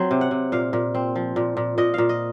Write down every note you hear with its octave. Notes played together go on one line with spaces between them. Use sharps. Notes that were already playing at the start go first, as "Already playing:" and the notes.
Already playing: F#3 C4 C5
C3
F#5
C3
A#2 F5
A#2
C4
F3
A#2
A#2
A#2 D#5
A#2 F5
D#5